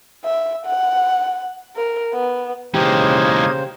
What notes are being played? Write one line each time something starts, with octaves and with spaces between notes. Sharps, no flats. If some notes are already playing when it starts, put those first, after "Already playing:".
E5
F#5
A#4
B3
C#3 E3 G#3 A#3 D#4 G4 C5 G#6